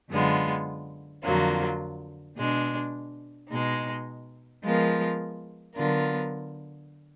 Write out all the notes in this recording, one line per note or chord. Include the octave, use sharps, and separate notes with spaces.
F#2 D3 G#3 B3 F4
F2 D3 F#3 A#3 F4
B2 G#3 D4
B2 G#3 D#4
F3 G#3 B3 F4 A#4
D3 F#3 B3 F4 A#4